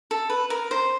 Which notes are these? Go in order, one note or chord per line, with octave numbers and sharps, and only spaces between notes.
A4
B4
A#4
C5